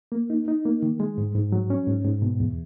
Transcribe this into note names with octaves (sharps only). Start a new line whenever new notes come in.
A#3
D#4
D#4
A#3
D#3
G#3
G#2
G#2
F#3
C#4
G#2
G#2
B2
E2